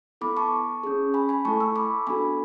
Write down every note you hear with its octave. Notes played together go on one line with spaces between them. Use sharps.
B3 E4 A4 B5 D6
A5 C#6
C#4 G#4
G#5 B5
G#5 B5
A3 E4 A4 A5 C#6
C#6 E6
B5 D6
B3 D4 F#4 A4 G#5 B5